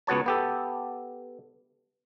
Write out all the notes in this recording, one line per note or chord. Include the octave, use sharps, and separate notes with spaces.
C#2 B3 F#4 C#5 A5
B3 G4 A4